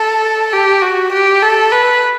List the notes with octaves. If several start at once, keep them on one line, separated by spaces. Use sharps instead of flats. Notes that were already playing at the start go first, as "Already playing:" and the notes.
Already playing: A4
G4
F#4
G4
A4
B4